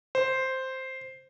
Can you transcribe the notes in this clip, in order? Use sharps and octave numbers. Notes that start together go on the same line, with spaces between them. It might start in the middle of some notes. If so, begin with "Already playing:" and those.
C5